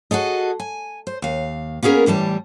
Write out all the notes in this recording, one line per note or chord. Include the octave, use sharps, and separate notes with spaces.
F#4 G#4 A4 D#5
G#5
C5
D#2 F5
A#3 B3 C#4 G#4 A#4
A2 E3 G3 A5